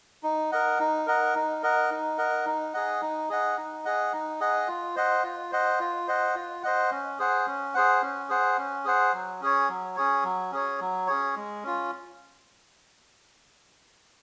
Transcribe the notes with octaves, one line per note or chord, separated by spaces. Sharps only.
D#4
A#4 D#5 F#5
D#4
A#4 D#5 F#5
D#4
A#4 D#5 F#5
D#4
A#4 D#5 F#5
D#4
G#4 D#5 F#5
D#4
G#4 D#5 F#5
D#4
G#4 D#5 F#5
D#4
G#4 D#5 F#5
F4
C5 D#5 F#5
F4
C5 D#5 F#5
F4
C5 D#5 F#5
F4
C5 D#5 F#5
C#4
G#4 C5 F#5
C#4
G#4 C5 F#5
C#4
G#4 C5 F#5
C#4
G#4 C5 F#5
F#3
C#4 G#4 C#5
F#3
C#4 G#4 C#5
F#3
C#4 G#4 C#5
F#3
C#4 G#4 C#5
G#3
C#4 F4